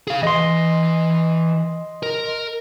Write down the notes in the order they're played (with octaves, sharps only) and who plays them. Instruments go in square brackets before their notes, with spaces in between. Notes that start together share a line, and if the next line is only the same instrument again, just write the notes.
[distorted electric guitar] G#4 F5
[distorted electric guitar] E3 [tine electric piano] D#5 C6
[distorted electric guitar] A#4